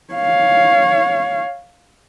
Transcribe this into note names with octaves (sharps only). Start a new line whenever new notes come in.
C#5 F5